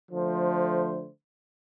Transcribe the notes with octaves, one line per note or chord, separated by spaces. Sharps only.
D3 F3 A3 C5